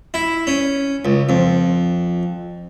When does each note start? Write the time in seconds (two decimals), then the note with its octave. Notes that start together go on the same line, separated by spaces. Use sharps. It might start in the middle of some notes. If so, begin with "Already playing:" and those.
0.14 E4
0.47 C#4
1.05 C#2
1.29 F2